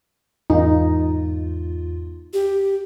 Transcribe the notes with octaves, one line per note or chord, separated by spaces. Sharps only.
E2 G#2 D#4 F4
G4